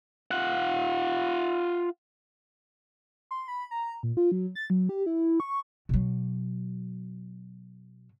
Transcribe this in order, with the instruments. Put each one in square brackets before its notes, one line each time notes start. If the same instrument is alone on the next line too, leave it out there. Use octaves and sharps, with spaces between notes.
[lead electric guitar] F4 F#5
[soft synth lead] C6
B5
A#5
A#2
F4
F#3
A6
F#3
G4
E4
C#6
[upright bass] B2 F#3